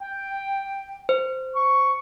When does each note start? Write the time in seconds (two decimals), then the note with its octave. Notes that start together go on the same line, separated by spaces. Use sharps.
0.01 G5
1.09 C5
1.55 C#6